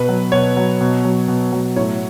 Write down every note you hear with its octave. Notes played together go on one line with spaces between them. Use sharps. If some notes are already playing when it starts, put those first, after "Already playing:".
Already playing: B2 B4
F#3
B2 C#5
F#3
B2
F#3
B2
F#3
A2 C#5